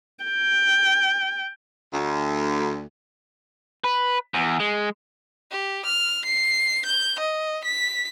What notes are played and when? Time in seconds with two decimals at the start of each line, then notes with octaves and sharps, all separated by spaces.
0.24 G5
1.92 D2
3.84 B4
4.34 E2
4.60 G#3
5.51 G4
5.86 F6
6.25 C7
6.86 G6
7.20 D#5
7.65 B6